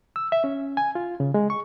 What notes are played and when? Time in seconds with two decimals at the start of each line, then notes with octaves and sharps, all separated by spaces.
0.16 E6
0.32 E5
0.44 C#4
0.77 G#5
0.95 F4
1.20 C#3
1.34 G#3
1.50 C#6